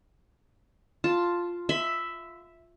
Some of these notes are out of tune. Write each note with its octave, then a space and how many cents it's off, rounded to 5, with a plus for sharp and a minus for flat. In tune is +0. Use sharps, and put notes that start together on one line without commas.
F4 +0 A5 +0
E5 +0 B5 +40